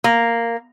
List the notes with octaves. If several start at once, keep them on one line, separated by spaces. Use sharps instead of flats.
A#3